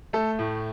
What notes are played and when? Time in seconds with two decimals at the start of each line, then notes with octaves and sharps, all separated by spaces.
0.13 A3 A4
0.39 A2